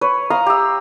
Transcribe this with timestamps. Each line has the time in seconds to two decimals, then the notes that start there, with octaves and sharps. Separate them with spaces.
0.01 B4 C#5
0.30 F5 A#5 C6 D#6
0.46 G4 E6